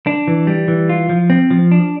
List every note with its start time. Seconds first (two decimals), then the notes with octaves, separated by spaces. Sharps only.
0.07 D4
0.28 E3
0.47 G3
0.68 E3
0.89 F4
1.10 F3
1.30 C4
1.51 F3
1.71 D4